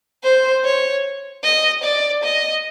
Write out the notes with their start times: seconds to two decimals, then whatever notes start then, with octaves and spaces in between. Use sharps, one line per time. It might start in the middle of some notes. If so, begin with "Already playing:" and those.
0.24 C5
0.64 C#5
1.44 D#5
1.83 D5
2.23 D#5